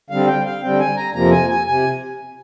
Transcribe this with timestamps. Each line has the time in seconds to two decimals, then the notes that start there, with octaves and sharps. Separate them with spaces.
0.10 D3 G3 C4 F5
0.27 G5
0.46 F5
0.62 D3 G3 C4 G5
0.80 G#5
0.97 A#5
1.14 F2 C3 F3 A#3 A#5
1.32 G#5
1.50 G#5
1.67 C3 G#5